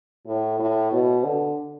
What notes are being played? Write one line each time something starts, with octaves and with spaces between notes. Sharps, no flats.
A2
A2
B2
D3